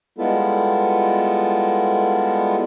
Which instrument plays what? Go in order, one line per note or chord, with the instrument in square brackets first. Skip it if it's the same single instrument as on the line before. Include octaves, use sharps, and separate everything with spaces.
[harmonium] G3 G#3 B3 E4 F4 A4